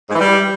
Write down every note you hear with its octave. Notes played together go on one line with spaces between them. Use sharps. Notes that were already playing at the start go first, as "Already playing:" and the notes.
G#2
E3
G3